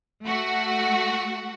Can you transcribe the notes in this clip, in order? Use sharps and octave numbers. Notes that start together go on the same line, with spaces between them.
A3 F#4 F#5